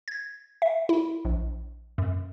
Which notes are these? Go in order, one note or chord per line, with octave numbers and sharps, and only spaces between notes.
G#6
E5
E4
A#1
F#2